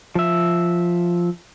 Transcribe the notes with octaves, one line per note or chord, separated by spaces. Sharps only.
F3 E5